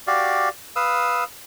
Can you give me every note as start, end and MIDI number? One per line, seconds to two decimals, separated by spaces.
0.07 0.49 66
0.07 0.49 67
0.07 0.49 74
0.07 0.49 77
0.76 1.24 71
0.76 1.24 77
0.76 1.24 87
0.76 1.24 88